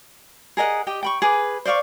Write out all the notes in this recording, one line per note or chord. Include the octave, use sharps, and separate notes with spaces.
G#4 A#4 D#5 F#5
G4 D#5 G5
G5 B5 C#6
G#4 B4 G#5 D6
C5 D5 F5 C#6